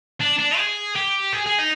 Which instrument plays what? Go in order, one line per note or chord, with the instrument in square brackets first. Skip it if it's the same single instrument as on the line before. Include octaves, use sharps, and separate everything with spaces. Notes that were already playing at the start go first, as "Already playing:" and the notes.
[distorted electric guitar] D4
D4
G#4
G4
G#4
G#4
D#4